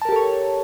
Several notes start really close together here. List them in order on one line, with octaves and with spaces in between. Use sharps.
A5 A#4 G4 A4 C#5